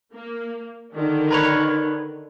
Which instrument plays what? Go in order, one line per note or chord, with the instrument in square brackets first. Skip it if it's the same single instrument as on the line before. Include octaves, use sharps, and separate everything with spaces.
[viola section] A#3
D3 D#3 D4
[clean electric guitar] A#4 B4 C#5